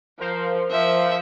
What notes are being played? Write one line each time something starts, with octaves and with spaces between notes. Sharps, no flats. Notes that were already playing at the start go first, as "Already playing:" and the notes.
F3 A#4 C5 F5
F3 E5